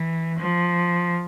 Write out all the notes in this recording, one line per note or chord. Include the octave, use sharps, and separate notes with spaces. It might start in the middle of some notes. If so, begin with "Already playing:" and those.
Already playing: E3
F3